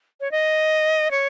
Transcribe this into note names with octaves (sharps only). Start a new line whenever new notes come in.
C#5
D#5
C#5